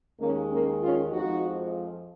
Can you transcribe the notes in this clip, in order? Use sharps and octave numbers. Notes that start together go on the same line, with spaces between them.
D#2 D#3 G#3 A#3 C#4
A#3 C#4
C#4 F4
F2 F3 G#3 D#4 F#4